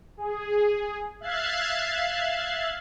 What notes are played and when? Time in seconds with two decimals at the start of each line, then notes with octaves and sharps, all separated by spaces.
0.17 G#4
1.20 E5 F5 F#6 G#6 A6 C7